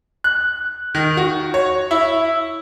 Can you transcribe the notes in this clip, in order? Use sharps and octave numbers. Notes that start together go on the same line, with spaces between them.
F#6
D#3
F#4
C#5
E4